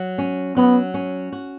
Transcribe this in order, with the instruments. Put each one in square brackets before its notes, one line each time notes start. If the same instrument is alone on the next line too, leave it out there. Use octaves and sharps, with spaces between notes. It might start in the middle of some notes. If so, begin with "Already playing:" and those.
Already playing: [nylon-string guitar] F#3
C#4
[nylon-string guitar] F#3 [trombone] B3
[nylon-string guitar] C#4
F#4